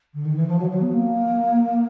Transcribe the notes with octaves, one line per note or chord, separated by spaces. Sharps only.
D3
D#3
E3
F3
F#3
F#3
B3
A#3